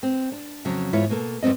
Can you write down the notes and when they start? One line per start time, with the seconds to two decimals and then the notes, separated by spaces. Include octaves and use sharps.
0.03 C4
0.32 D4
0.65 F2 C#3 F#3
0.93 E2 G#2 E4 F4 C#5
1.09 B2 A#3 A4
1.43 F#2 G3 B3 C4 D#5